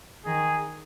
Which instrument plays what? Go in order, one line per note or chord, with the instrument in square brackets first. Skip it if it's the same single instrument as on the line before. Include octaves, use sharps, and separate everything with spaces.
[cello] D#3 [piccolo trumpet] G#4